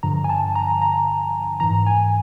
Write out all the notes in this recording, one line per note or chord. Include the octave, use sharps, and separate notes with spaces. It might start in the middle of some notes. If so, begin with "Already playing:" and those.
G2 D3 F3 A#5
G#5
A5
A#5
A#5
G#2 E3 A#5
G#5